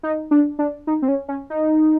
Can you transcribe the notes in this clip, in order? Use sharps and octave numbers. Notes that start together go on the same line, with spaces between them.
D#4
D4
D4
D#4
C4
C#4
C#4
D#4